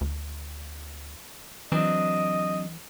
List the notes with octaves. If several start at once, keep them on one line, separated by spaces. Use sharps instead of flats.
D2
E3 F#3 C4 D4 D#5